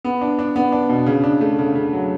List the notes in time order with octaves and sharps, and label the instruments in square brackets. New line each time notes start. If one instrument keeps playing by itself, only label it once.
[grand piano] B3
D4
D4
B3
D4
B2
C#3
D4
A3
C#3
C#3
F#3